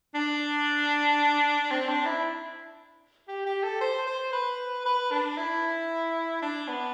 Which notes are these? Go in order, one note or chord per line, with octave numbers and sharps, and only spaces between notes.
D4
C4
D4
E4
G4
G4
A4
C5
C5
B4
B4
D4
E4
D4
B3